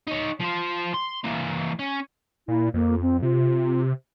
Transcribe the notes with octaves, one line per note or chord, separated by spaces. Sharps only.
D#4 C#5
F3 C5
C6
E3 A#3
C#4
A#2 E4
F2 A#3
C4
C3 F4